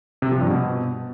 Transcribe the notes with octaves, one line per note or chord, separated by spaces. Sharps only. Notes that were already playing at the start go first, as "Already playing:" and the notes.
C3
F3
G2
B2